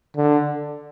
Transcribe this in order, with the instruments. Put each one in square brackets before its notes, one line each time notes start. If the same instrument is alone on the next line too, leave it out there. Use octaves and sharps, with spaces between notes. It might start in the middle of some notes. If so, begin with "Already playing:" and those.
[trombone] D3